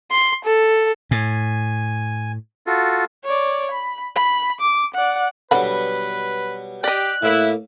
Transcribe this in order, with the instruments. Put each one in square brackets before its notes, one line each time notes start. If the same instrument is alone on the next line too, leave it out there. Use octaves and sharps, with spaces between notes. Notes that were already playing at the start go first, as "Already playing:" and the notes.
[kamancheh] C6
A4
[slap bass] A2 [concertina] G#5
[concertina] F4 F#4 A4
[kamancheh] C#5 D5
B5
B5
D6
D5 F#5
[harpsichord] B2 F#3 G3 [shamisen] D3 F#5 B5 [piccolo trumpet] B4
[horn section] G4 [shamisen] D5 D#5 [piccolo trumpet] F#6
[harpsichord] A2 A#3 [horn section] E4